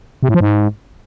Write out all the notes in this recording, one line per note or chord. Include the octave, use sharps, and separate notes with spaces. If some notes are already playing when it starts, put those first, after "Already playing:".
C3
A2
F3
G#2